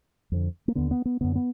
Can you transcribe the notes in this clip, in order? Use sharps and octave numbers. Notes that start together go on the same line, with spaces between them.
F2 D3
A#3
D#2 D3 B3
B3
B3
F#2 D3 B3
B3